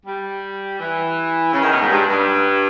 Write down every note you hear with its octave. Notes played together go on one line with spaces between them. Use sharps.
G3
E3
C#3
D#3
B2
G#2
G2
G2